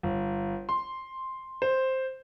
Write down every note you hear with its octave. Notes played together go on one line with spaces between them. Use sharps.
G1
C6
C5